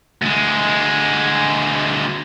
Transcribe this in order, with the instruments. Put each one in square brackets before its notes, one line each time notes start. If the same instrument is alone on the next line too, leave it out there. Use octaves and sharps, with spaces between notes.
[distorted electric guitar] D2 G#3